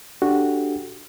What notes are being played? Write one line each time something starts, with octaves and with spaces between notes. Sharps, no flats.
D4 F#4 G4 A4